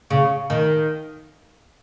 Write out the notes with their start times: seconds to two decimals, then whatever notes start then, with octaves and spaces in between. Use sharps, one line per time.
0.10 C#3
0.50 D#3